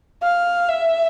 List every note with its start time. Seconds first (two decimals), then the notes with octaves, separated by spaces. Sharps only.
0.23 F5
0.69 E5